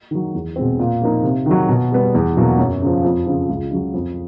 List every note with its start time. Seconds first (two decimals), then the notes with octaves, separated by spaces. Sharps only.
0.11 D#3 F#3
0.34 E2
0.56 B2 G#3 C4
0.79 A#2
1.02 F3 A#3 D#4
1.23 C3
1.46 D#3 F#3
1.69 B2
1.92 G3 B3
2.15 E2
2.37 B2 F#3 A#3
2.58 F#2
2.82 C#3 F3
3.04 F2
3.27 C#3 F3
3.49 C#2
3.71 C#3 F#3
3.94 F2